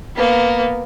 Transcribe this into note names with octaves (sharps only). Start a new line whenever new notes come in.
A#3 B3